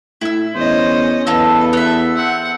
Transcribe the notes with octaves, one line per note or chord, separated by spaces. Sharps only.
A2 E4 E6
E2 C#4 C5 D#5
E2 A4 B4 D#5 F5 A5
B3 E5
C4 F#5